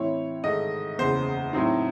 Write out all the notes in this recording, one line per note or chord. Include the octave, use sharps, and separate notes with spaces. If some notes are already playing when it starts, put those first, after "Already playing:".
Already playing: A2 E3 C4 E4 C#5
G#2 D#3 A3 D#5
F#1 E2 C#3 C5
A2 F#3 C4 D#4